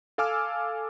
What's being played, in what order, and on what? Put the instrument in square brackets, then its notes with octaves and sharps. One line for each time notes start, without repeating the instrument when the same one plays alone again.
[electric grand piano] A4 F5 G#5 D6 E6 F6